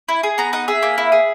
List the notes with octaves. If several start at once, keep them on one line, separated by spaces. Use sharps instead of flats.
E4
G#4
B3 A#5
D#4 F#5
G#4 E5
A#3
E4
G#4